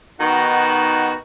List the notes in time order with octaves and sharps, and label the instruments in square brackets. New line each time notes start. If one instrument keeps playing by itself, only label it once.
[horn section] D#3 B3 D#4 F#4